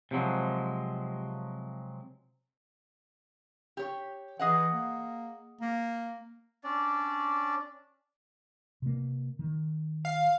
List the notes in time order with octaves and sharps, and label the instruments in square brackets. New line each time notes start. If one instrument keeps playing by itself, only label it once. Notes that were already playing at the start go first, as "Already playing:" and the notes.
[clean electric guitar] C3 F3 F#3 G#3
[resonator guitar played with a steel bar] G4 C#5
[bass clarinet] E3 [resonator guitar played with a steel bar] G#4 D#5 F#5
[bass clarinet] A#3
A#3
[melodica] C#4 D4 D5
[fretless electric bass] C3 A#3
D#3
[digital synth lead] F5